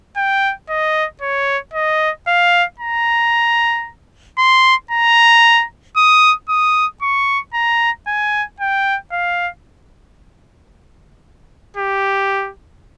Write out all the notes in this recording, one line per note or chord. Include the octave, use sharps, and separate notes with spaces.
G5
D#5
C#5
D#5
F5
A#5
C6
A#5
D#6
D#6
C#6
A#5
G#5
G5
F5
G4